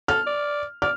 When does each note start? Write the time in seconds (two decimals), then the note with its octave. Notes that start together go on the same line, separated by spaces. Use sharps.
0.08 A4 F6
0.26 D5
0.82 D5 F6